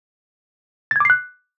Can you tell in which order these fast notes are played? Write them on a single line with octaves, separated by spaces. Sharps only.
A6 G#6 D6 C7 F#6